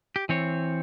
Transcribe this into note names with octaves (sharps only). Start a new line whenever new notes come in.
G4
E3 C4 C#5